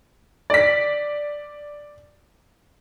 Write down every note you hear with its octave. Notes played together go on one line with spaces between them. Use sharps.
D5 B6